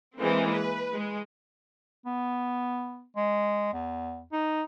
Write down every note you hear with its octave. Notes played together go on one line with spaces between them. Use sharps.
E3 G#3 A#3 C4
B4
G#3
B3
G#3
E2
D#4